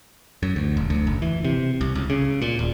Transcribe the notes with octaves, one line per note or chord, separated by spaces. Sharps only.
F#2
D2
E1
D2
F#1
E3
C3
C2
C#2
C#3
A#2
D#1